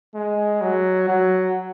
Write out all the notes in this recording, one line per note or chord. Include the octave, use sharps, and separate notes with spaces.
G#3
F#3
F#3